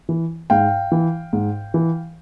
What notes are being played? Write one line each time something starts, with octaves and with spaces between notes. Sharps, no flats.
E3
G#2 F5 G5
E3
G#2
E3